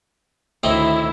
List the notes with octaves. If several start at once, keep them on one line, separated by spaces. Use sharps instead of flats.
D2 A2 D#3 C4 D#4 E4